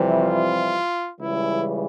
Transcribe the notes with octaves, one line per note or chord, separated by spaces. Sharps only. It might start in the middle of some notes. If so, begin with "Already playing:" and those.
Already playing: F2 C3 E3 G3
F4
C#2 C#3 E3 G3 E4